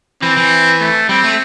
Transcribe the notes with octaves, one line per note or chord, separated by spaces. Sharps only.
E3 C4
E3
A3
G3 C4
A3